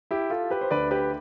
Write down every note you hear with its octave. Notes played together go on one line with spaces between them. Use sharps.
E4 G4
F4 A4
G4 B4
C5
D2 D3 B4 D5
G4 B4